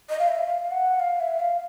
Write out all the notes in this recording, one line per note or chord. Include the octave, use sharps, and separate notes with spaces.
D#5
F5
E5
F5
F#5
F#5
F5
E5
F5